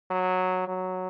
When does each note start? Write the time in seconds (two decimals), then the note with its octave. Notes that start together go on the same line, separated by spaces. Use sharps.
0.11 F#3
0.68 F#3